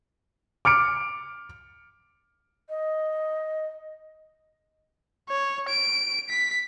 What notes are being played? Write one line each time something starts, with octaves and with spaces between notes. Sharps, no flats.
D6 F6 C#7 D7
D#5
C#5
D7
B6